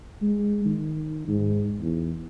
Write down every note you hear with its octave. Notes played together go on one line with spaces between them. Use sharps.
G#3
D#3
G#2
E2